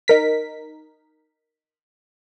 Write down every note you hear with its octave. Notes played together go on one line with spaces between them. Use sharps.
D#4 A#4 B6